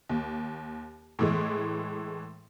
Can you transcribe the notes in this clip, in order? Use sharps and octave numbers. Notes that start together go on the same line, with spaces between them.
D#2
A2 E3 G#3